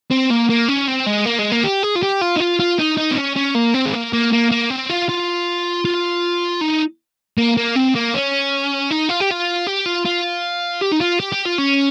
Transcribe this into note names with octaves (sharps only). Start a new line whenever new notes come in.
C4
A#3
A#3
C#4
C4
G#3
A#3
G#3
A#3
G4
G#4
F4
G4
F4
D#4
F4
F4
D#4
D#4
C4
C#4
C#4
A#3
C4
G#3
A#3
A#3
A#3
A#3
C4
F4
F4
F4
D#4
A#3
A#3
C4
A#3
C#4
D#4
F4
G4
F4
G4
F4
F4
G4
D#4
F4
G4
G4
F4
C#4